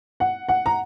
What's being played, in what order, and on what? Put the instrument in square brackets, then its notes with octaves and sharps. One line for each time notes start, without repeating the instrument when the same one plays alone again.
[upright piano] F#5
F#5
A#5